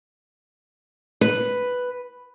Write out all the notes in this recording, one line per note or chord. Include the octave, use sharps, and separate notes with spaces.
B4